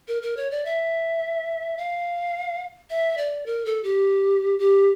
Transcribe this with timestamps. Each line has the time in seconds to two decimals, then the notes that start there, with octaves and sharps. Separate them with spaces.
0.08 A#4
0.22 A#4
0.37 C#5
0.51 D5
0.65 E5
1.77 F5
2.90 E5
3.18 D5
3.46 A#4
3.65 A4
3.83 G4
4.59 G4